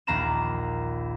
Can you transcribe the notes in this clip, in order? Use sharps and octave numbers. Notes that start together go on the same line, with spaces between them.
A#1 D#2 F5 A#5 B5 E7